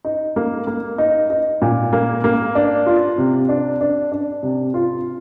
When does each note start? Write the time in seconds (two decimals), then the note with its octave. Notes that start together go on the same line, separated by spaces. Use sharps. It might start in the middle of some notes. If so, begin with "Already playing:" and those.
0.05 D#4
0.36 A#3
0.67 A#3
0.98 D#4
1.30 D#4
1.62 A#2
1.93 A#3
2.24 A#3
2.55 D4
2.86 F4
3.18 C3
3.49 D4
3.81 D4
4.12 D4
4.43 C3
4.74 F4